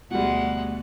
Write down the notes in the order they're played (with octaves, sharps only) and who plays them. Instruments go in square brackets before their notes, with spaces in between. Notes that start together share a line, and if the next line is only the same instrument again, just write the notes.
[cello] D2 [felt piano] B2 G3 [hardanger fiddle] G#3 F#5